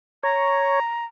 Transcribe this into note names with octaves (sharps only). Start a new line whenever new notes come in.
C#5 A#5